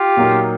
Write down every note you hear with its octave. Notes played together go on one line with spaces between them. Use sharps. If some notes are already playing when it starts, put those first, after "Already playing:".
Already playing: F4 G4
A#2 F#3 A#3 D#4